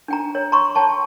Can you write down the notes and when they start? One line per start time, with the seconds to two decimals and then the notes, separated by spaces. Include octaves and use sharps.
0.08 D4 G5 A#5
0.35 C#5
0.52 A#5 C6 C#6
0.75 C#5 G5 A5 C#6